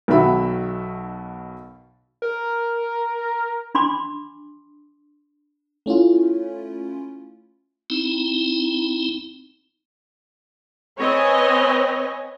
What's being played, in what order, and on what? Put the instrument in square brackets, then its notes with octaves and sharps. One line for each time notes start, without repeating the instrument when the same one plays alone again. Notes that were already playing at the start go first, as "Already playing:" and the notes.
[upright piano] B1 B2 D#3 F#4 E5 B5
[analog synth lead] A#4
[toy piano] D4 B5 C6 D6
[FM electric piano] A3 C#4 E4 F4
[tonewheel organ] C4 D#4 E4
[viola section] C4 B4 C#5 D#5 G#5